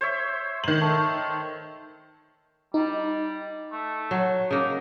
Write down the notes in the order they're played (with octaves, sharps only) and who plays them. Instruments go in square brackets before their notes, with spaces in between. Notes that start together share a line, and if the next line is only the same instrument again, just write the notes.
[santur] C5 C#5 E5
[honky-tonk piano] D#3 F#7
[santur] A3
[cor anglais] G3 [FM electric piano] D#4
[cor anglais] A3
[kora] F#3
[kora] C#3 A#3 [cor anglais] D#4